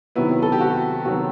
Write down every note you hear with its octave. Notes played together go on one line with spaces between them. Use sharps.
C3 D#3 F#3 B3 E4
A4
G4
F#4
C3 D#3 F#3 B3 F#4